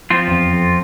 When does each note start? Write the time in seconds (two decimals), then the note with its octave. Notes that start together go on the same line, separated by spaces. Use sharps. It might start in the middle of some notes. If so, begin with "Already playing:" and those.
0.10 F3 C4 F4
0.28 E2
0.31 F2
0.53 F2